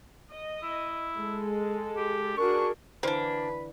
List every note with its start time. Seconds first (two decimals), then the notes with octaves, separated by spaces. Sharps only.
0.32 D#5
0.63 E4
1.16 G#3 A4
1.97 G4
2.38 D4 F#4 G#4 A#4 C#6
3.03 D3 E3 A#3 D4 B4 C5